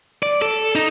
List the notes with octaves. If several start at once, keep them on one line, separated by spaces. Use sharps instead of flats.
D5
A4
D#4